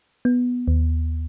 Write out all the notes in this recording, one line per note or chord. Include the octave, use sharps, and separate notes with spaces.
B3
D#2